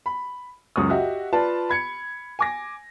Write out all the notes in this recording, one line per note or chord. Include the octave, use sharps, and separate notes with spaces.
B5
C#2 F#2 C#6 D#6
F#4 G4 D#5 E5
F4 B4 D5 A5
B5 G#6 C#7
G#5 D6 A#6